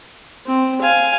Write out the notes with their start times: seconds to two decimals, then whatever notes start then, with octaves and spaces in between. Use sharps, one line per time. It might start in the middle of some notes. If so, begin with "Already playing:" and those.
0.46 C4
0.81 F5 G#5